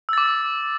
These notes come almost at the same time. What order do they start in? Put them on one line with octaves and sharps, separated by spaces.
E6 A6 D6